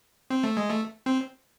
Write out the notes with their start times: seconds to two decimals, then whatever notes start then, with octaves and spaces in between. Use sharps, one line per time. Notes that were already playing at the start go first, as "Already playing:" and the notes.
0.30 C4
0.44 A3
0.57 G#3
0.70 A3
1.06 C4